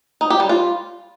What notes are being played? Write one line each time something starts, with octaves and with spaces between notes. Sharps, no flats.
D#4
G4
G3
F4